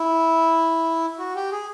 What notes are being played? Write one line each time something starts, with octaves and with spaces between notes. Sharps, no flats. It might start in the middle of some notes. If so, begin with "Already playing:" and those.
Already playing: E4
F#4
G4
G#4